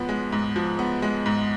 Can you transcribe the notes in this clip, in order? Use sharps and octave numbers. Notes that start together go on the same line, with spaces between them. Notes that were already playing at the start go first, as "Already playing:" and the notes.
Already playing: G#2 F3 B3
G#3
G#2
F3
B3
G#3
G#2